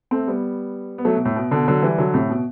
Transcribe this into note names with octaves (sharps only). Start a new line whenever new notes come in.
A3 C4
G3 B3
B3
F#3 A3
B2
A2
B2
B2 D3
D3 F#3
E3 G3
D3 F#3
A2 C3
B2